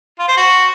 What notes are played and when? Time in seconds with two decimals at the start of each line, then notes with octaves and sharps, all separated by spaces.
0.19 F4
0.28 C5
0.37 F#4